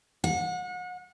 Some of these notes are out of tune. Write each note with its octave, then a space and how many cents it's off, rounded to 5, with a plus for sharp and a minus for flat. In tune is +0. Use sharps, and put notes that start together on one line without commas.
F#5 -35